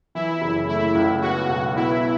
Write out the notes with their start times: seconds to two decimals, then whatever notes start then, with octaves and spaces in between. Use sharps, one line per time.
0.15 E3 E4
0.41 F#1
0.68 A3 E4
0.95 C#2
1.22 B3 F#4
1.49 B1
1.76 B3 E4